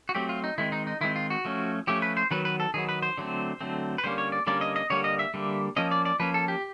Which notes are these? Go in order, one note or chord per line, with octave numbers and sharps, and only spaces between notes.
F#4
F#3 A3 C4 G4
F4
D#4
D#3 G#3 C4 E4
D#4
D#4
D#3 G#3 C4 E4
F4
F#4
F3 A3 C#4
F3 A3 C#4 G4
B4
C5
D#3 F#3 B3 B4
B4
A4
D#3 F#3 B3 G#4
B4
C5
D3 F#3 A3 C4
D3 F#3 A3 C4
B4
D3 G3 A#3 C#4 C5
C#5
D5
D3 G3 A#3 C#4 D5
D#5
D#5
D3 G3 A#3 C#5
D#5
E5
D3 G3 A#3
F3 A#3 C#4 D#5
D5
D5
F3 A#3 C#4 B4
A4
G4